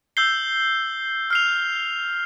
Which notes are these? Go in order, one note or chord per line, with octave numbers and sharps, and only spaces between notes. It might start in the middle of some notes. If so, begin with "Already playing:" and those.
E6 G6 C7 G7
F6 C7 F7